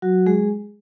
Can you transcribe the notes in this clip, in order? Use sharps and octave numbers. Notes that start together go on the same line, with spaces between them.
F#3 F#4
G#3 G#4